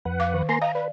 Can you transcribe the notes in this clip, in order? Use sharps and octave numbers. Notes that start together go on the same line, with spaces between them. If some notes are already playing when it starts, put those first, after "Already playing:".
F2 B4 F#5
F5 D6
D#3
A#3 G#5 A#5 C6
D#5 F5 A#5
B4 D5